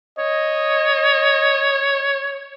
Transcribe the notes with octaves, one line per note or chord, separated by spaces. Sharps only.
C#5 D#5